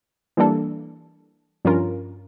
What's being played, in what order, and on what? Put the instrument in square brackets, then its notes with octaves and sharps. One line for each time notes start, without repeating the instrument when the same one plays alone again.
[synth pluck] E3 G3 A#3 D4 A4
G2 F3 C#4 F4 A#4